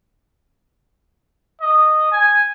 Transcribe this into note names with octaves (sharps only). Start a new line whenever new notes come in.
D#5
G#5